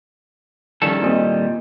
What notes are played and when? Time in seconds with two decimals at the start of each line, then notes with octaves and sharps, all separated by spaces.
0.82 A#1 D#3 E3 G3 C#4 A4
1.02 G#1 A#2 E3 C4 D#5